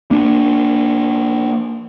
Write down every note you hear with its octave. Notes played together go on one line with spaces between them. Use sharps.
A#3 D4